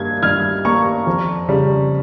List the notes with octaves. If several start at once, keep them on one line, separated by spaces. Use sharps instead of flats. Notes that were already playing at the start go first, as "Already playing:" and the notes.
Already playing: G2 G3 A#3 G#6
G2 F6 G#6
G3 A#3 A#5 C#6
F2
C#3 G3